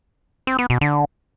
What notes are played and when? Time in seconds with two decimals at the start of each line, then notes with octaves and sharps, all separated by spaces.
0.47 C4
0.59 B3
0.70 B2
0.81 D3